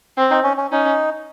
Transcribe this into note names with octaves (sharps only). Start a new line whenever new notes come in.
C4
D#4
C#4
C#4
C#4 D#4